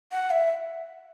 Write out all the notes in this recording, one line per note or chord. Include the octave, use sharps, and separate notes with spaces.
F#5
E5